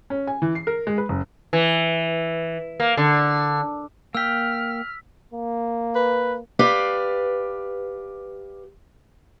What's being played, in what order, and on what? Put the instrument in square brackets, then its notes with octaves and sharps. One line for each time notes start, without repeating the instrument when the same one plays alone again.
[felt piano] C#4
G#5
E3
C7
A#4
G#3
B4
F#1
[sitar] E3
A#3
D3
[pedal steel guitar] A#3 G5 [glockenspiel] E6 B6 [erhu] F6
[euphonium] A#3
[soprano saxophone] B4
[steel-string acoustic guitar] G4 B4 D5 F5